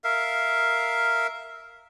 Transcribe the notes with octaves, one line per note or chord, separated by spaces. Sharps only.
A#4 E5 F5